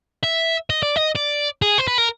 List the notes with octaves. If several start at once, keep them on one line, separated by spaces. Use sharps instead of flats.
E5
D#5
D5
D#5
D5
G#4
C5
B4
A#4